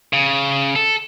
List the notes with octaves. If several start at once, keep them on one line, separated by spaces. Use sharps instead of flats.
C#3
A4